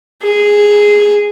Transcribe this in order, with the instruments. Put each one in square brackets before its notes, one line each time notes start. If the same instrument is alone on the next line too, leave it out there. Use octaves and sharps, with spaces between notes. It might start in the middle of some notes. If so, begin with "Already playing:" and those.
[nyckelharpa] G#4